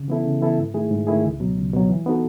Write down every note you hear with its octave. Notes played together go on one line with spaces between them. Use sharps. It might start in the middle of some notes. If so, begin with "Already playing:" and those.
Already playing: C#3
E3 B3 E4 A4
C#3
E3 B3 E4 A4
G#2
D#3 A3 E4 G#4
G#2
D#3 A3 E4 G#4
C#2
B2 F#3
C#2
B2 F#3
E3
B3 D#4 F#4 A4